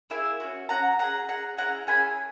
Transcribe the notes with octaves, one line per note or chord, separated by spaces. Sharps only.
A#3 E4 G#4 E5 G#5
C#4 F#4
C#4 F#4 F#5 A#5
C#4 G#4 F#5 A#5
C#4 G#4 F#5 A#5
C#4 E4 G#4 F#5 A#5
C#4 E4 G#4 G#5 B5